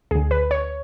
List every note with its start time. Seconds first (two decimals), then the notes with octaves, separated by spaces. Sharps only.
0.11 D2 D3 G#4
0.31 B4
0.51 C#5